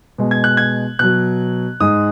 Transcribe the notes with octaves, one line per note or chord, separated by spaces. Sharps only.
B2 G#3
G#6
F#6
G#6
B2 F#3 F#6
G#2 G#3 D#6